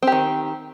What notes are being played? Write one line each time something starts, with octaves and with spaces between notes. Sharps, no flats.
D#3 C4 G4